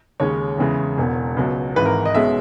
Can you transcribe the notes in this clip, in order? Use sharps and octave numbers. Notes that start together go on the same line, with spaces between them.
D#2 C#3 G#3 C#4 C#5
E2 C#3 E3 G#3
E1 E2 B2
C#2 B2 F#3
G#1 G#2 E3 B4
A#4
D#5
B1 B2 G#3 C#4 E5